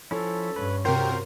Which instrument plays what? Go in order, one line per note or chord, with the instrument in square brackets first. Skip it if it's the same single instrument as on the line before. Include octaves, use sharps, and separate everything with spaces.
[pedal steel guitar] F3 C#4 E4 [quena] A4
[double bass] G2 C#4 [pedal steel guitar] B4
[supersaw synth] C3 A#4 [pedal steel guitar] F4 F#4 C5 [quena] G5